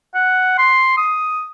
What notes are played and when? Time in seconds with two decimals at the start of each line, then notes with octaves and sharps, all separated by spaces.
0.15 F#5
0.58 C6
0.97 D#6